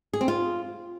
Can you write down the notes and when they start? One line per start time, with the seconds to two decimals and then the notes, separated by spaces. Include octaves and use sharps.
0.13 G#4
0.21 C4
0.28 F4